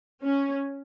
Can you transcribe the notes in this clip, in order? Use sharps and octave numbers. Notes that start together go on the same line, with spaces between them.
C#4